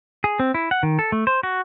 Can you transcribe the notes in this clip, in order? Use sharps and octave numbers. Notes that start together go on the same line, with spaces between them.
G#4
C4
E4
F#5
D#3
A4
A3
C5
F#4